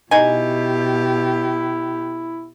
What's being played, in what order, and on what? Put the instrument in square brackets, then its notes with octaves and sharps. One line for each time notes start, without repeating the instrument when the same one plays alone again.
[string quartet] B2 G4 [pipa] D#4 G#5 [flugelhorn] E4